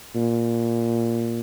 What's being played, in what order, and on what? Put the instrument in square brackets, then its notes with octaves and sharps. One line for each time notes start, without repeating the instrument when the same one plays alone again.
[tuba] A#2